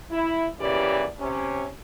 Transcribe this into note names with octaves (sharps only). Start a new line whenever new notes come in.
E4
E2 A#2 C#3 E3 G4 D5
C3 C#4